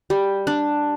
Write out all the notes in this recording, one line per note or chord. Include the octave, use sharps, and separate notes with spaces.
G3
D4